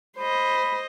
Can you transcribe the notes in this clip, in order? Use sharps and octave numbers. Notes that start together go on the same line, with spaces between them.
C5 D#5 B5